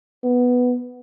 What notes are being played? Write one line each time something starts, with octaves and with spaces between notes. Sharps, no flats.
B3